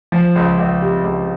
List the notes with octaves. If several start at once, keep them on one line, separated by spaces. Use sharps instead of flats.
F3
C#2
C#2
C3
C#2